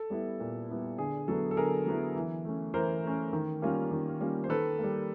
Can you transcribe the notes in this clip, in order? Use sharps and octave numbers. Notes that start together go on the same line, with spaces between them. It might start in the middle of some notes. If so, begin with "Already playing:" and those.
Already playing: A4
G3 B3 E4
A#2
G3 B3 E4
D3 G#4
F#3 B3 E4 A4
A4
D3 G#4 A#4
F#3 B3 E4
E3
A3 C#4
E3 A#4 C5
A3 C#4
D#3
G3 A#3 C#4 F4
D#3
G3 A#3 C#4 F4
C5
D#3 A4 B4
G3 A#3